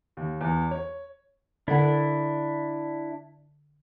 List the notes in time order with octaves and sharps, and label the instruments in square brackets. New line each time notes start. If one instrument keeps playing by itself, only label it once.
[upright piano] D#2
E2
C#5
[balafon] D3 A4 F#5 [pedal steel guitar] D4 E4